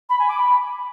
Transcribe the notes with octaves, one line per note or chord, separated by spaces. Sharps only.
B5
G#5
D6
B5